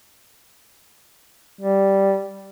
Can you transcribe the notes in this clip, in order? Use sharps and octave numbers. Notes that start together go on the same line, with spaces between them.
G3